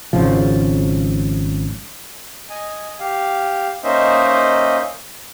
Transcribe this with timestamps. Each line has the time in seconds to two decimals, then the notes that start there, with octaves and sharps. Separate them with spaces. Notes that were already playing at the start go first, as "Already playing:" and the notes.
0.13 G#1 C#3 F3
2.49 D#5 G#5
3.00 G4 F5
3.84 A#3 C#4 D#4 C5 D#5 E5